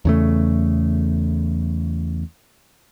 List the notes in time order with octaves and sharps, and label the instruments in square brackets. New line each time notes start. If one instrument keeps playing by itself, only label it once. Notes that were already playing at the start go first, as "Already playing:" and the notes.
[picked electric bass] E2 C#3 A3